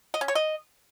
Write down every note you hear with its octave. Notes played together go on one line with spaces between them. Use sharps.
D#5
C#4
C#5
D#5